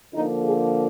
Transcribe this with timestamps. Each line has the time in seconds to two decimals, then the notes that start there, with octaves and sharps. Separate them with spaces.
0.14 D3 F3 A#3 D#4
0.44 G#4